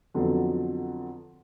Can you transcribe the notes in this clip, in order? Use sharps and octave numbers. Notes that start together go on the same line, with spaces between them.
F2 D3 F#3 B3